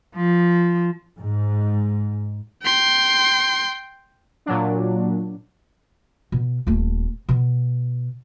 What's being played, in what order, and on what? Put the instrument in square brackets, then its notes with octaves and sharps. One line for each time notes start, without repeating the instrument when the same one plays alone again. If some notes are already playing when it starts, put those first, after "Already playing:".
[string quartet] F3
[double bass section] G#2
[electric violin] G5 C6
[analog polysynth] A#2 F#3 D4
[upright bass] B2
D#1 A3
B2